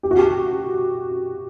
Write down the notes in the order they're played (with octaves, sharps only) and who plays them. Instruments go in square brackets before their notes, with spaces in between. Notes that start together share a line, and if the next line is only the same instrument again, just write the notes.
[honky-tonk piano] G4
F#4
G4